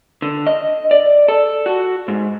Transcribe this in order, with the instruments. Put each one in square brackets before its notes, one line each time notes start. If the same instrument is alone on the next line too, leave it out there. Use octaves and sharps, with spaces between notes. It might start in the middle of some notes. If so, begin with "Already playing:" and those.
[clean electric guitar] D3
D#5
D5
A4
F#4
G#2